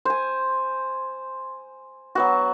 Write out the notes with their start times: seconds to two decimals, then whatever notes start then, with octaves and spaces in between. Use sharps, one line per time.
0.05 C5 G#5
2.15 F#3 B3 F#4